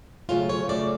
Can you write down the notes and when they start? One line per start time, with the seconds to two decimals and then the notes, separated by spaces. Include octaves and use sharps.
0.29 C#3 F#3 A3 C#4 F4
0.49 C#5
0.69 C#3 F#3 A3 C#4 D5